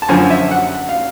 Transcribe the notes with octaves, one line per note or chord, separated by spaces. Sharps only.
A5
F#2 D3 F3 G#5
E5
F#5
F5